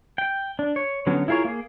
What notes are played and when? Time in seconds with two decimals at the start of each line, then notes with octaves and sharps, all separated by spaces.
0.18 G5
0.59 D4
0.76 C#5
1.07 D3 F#3 B3 C#4
1.28 E4 F4 G#4 A#4 C#5
1.44 A#3 G#4